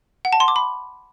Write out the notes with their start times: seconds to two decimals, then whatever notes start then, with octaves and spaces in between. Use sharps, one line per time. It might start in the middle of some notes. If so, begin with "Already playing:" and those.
0.25 F#5
0.33 A5
0.40 C6
0.48 D6
0.56 B5